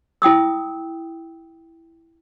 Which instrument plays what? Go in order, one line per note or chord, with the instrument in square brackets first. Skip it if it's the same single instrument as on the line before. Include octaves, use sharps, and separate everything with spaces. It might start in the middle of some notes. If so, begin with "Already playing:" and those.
[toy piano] E4 G5 D#6 E6